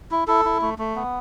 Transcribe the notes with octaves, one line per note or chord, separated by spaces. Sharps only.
E4
E4 A4
E4
A3
A3
B3